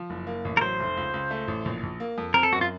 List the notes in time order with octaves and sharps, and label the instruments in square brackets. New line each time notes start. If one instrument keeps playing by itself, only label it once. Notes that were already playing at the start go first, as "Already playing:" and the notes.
Already playing: [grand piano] F3
F#1
A#3
A1
[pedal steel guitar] A#4
[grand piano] F#3 [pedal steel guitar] C5
[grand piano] F1
C#2
C#2
A3
A1
A#1
A#1
A#3
F2
[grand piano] C4 [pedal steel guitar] A#4
[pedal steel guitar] A4
[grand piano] F#2 [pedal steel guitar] F#4
[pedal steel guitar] F4